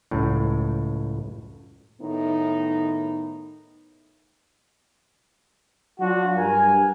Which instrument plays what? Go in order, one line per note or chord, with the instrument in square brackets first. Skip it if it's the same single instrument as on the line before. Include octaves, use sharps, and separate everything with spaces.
[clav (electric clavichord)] C#2 F#2 A2
[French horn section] A2 D#3 B3 D#4
[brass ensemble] F#3 D4 F4 F#4
G2 A#4 G#5